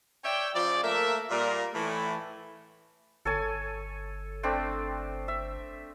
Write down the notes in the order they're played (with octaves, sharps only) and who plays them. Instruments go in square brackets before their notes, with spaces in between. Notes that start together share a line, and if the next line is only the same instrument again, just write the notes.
[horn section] C#5 D5 E5 G5
C#3 F3 D5
A3 A#3 A#4 E5
A#2 G3 A#4
A2 E3 A3
[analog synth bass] G1 [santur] A4 C#5 G#5
[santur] A3 C4 D4
E5